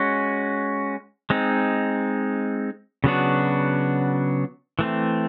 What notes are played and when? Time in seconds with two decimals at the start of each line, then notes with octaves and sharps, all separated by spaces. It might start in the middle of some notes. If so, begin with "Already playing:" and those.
Already playing: G#3 C#4 F#4
1.30 G#3 C4 D#4
3.04 C#3 F#3 B3 D4 F#4
4.79 E3 A3 C4